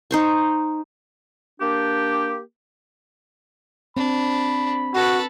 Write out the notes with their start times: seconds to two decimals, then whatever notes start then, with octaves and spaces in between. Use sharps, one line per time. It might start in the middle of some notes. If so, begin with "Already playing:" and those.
0.11 D#4 C5 C#6
1.60 A#3 D4 G4
3.97 C4 D4 B5
4.94 F#4 A4 B4